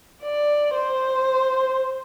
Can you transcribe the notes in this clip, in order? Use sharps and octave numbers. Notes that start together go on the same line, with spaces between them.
D5
C5